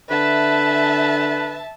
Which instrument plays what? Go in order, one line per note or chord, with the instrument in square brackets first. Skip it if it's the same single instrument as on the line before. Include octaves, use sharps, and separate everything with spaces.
[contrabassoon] D3 [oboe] B4 [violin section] E5 A5